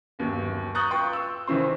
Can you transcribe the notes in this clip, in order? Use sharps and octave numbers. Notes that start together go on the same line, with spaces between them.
G1 D#2 F#3
A#5 C#6 D#6 F#6 G6 A6
F4 B4 G5 C6 C#6
E6
C2 D#3 E3 C4 C6